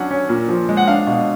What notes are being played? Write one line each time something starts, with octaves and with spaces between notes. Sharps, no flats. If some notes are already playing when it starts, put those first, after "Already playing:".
Already playing: F#3 C#4 D4 F#5
C#4
A#2
F3
G#3
F#5
D4 F5
B2